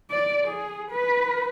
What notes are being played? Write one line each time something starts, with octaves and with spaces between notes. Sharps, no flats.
D5
G#4
B4